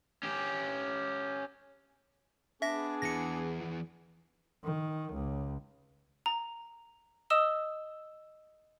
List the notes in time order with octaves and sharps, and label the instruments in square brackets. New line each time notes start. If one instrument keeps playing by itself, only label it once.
[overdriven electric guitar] C#4 G4
[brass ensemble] B3 G#4 [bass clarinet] D4 [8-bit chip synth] E5 A#6
[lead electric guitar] E2 E3 [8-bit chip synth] A#6 C#7
[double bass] D#3
C#2
[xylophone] A#5
D#5 D#6 E6 E7 G7